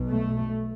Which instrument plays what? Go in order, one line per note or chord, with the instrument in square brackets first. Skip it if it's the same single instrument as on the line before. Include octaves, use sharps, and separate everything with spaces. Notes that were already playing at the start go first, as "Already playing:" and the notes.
Already playing: [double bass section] B1 B2
A3